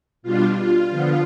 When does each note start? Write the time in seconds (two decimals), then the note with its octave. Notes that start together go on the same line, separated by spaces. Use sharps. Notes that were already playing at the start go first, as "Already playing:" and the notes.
0.22 B2 G3 D4 F4
0.56 F4
0.89 D3 F3 B3